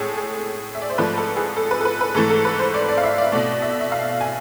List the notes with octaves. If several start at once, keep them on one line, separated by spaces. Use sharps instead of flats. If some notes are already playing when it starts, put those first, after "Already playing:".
Already playing: A2 G#3 G#4 A4
G#4
E5
D5
C5
G#2 F3 A3 B4
A4
G#4
A4
B4
A4
B4
B4
G#2 E3 A3 A4
A4
B4
C5
D5
D5
F5
E5
D5
B2 A3 D5
E5
E5
F5
G#5